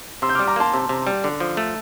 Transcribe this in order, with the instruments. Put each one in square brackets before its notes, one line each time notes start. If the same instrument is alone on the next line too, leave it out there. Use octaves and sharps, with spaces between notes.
[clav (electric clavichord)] C3 [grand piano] C6 E6
[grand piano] G6
[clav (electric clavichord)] G3 [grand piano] D6 F6
[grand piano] A#5 D6
[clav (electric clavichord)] A#3 [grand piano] A5 C6
[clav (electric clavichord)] C3
C3
G3
D3
F3
A3